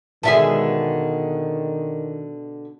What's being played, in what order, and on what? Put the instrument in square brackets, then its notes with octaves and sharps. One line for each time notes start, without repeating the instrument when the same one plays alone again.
[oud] B2 D3 G#3 [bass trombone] D#3 [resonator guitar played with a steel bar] G#4 E5 A5